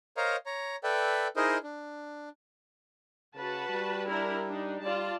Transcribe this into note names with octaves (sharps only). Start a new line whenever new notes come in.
A#4 C5 C#5 D#5 F5 A#5
C#5 A#5
A4 B4 D5 E5 G5
D#4 E4 G#4 A#4 C5 D#5
D4
C#3 F#4 B4 A5
G3
D4 E4 A#4
D4 D#4
G3 F4 D5 A5